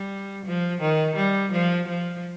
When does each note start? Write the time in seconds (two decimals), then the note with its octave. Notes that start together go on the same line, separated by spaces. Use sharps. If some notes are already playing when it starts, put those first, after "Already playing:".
Already playing: G3
0.46 F3
0.81 D#3
1.16 G3
1.52 F3
1.88 F3